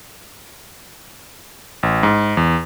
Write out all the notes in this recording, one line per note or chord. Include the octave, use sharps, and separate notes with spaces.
A1
G#2
E2